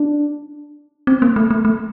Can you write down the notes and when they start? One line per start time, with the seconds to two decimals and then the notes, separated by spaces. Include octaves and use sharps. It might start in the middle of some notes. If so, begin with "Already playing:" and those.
Already playing: D4
1.07 C4
1.22 A#3
1.36 A3
1.51 A3
1.65 A3